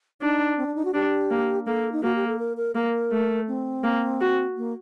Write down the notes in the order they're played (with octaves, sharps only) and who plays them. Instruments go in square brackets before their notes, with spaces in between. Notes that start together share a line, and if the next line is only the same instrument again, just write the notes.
[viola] D4 [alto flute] D#4
[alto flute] C4
D4
D#4
F#4
[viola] D4 [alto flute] G4
[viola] A#3
[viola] A#3 [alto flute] A4
[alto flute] D#4
[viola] A#3 [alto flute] F#4
[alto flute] G4
A4
A#4
A#4
[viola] A#3 [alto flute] A#4
[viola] A3
[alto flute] C4
[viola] A#3
F#4
[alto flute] A#3